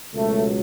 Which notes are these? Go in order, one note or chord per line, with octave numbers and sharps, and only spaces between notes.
C#2 B2 F#3 A3